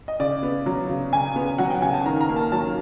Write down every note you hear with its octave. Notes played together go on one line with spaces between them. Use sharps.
D#5
C#3 D5
B3
F#3
C#3
C#3 G#5
B3
F#3 F#5
G5
C#3 G#5
A5
D#3 A#5
A#5
A#3
A5
F#3 A5